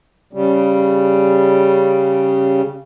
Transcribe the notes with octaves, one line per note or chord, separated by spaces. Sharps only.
C#3 G3